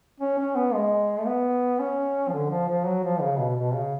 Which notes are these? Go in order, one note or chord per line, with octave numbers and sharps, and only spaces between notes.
C#4
C#4
B3
G#3
A3
B3
C#4
F3
D3
F3
F3
F#3
F3
C#3
B2
B2
C#3